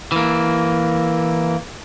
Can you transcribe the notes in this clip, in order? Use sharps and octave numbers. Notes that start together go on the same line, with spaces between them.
E3 A#3